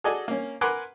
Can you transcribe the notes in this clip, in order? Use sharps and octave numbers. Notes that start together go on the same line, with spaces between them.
F#4 G#4 A4 D5 D#5 G#5
A#3 C#4
A#4 B4 F#5 G#5 C6 D6